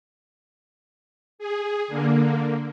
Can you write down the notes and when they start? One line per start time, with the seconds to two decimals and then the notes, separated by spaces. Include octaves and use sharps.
1.39 G#4
1.88 D3 A#3